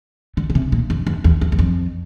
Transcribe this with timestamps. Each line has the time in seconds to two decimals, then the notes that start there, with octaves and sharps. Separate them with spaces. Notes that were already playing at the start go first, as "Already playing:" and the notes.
0.37 D3
0.50 D3
0.55 C3
0.72 A#2
0.90 F2
1.07 E2
1.24 E2
1.41 E2
1.52 E2
1.59 F2